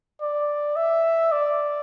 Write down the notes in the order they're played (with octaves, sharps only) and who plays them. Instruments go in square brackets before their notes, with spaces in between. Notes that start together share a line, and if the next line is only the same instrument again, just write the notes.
[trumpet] D5
E5
D5